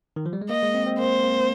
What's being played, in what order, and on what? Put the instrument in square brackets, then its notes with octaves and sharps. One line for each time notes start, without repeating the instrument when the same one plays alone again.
[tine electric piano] D#3
F3
G3
G#3
[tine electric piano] A#3 [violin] D#5
[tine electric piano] G#3
C4
C4
[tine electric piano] A#3 [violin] C5
[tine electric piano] A#3